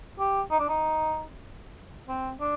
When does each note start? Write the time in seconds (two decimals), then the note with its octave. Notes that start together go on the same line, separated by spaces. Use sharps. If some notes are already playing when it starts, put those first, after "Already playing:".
0.19 G4
0.51 D#4
0.60 D4
0.69 D#4
2.08 C4
2.41 D4